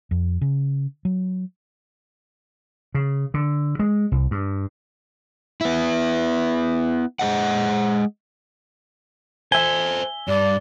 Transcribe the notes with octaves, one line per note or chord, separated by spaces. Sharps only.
F2
C#3
F#3
C#3
D3
G#3
C2
G2
B3 E4
G#3 G#4 D#5 F#5
A4 C5 E5 G#5 G7
G2 D5